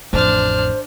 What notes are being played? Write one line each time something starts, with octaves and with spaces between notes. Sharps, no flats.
A1 F2 D4 C5 F6